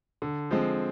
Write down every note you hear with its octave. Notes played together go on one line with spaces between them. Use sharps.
D3
F3 G#3 C4